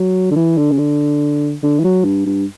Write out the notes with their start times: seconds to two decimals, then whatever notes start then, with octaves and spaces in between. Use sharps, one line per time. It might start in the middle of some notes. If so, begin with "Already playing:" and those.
Already playing: F#3
0.31 D3
0.36 E3
0.58 D3
0.72 C#3
0.78 D3
1.63 D3
1.80 E3
1.84 F#3
2.05 G2
2.26 G2